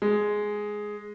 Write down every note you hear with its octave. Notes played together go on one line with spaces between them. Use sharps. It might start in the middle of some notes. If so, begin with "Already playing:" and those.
G#3